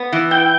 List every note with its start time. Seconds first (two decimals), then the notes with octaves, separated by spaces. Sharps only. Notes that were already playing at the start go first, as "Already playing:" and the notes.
Already playing: B3
0.12 E3
0.31 E4 G5